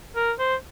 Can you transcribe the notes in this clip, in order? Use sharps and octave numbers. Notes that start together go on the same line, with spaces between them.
A#4
C5